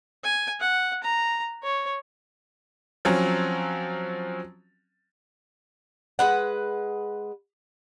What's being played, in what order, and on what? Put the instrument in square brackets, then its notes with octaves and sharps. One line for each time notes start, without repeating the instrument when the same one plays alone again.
[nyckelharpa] G#5
F#5
A#5
C#5
[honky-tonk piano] F3 F#3 C4 C#4
[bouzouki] G#3 B4 F#5